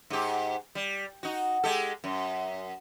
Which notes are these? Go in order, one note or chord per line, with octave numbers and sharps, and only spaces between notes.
G#2 G4
G3
D#4 F#4
G#3 G4 A4
F#2